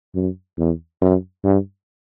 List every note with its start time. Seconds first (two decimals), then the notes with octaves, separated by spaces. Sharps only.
0.15 F#2
0.58 E2
1.01 F#2
1.44 G2